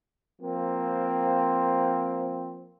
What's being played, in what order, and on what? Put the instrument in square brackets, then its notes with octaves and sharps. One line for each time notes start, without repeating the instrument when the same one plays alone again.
[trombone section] F3 A#3 C4